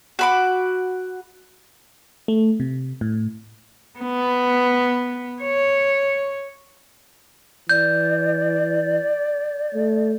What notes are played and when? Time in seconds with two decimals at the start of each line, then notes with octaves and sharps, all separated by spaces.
0.19 F#4 B5 D6
2.28 A3
2.60 C3
3.01 A2
3.99 B3
5.42 C#5
7.69 E3 D5 G6
9.75 A3